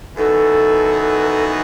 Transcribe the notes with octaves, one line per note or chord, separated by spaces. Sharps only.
F#2 E3 B3 D#4 F#4 A4